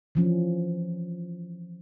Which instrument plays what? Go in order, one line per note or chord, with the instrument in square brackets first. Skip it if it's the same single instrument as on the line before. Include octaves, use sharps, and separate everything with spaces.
[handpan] E3 F3 C#4